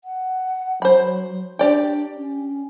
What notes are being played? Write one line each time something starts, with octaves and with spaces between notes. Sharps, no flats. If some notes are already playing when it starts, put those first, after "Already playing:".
F#5
F#3 C5 B5
D4 G4 D5 G5
C#4